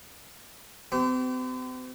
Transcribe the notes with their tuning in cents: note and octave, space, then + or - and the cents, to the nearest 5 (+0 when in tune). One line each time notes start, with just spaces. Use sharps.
C4 -45 G4 -35